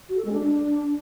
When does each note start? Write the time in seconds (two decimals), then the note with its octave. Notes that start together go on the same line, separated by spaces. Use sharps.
0.09 F#4
0.17 A4
0.25 G#3
0.33 D4